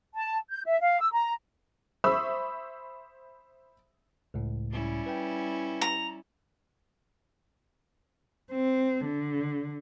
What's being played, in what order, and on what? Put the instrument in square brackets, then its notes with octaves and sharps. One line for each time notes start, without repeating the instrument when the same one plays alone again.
[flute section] A5
G6
E5
F5
E6
A#5
[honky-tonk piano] C5 E5 B5 C#6 D#6 E6
[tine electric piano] C#2 A2
[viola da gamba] G3 C#4 E4
[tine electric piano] B4 G5
[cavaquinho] A#5
[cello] C4
D3